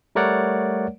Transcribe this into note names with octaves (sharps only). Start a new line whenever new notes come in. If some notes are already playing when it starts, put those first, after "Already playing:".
G3 A3 A#4 C#5 D5 F#5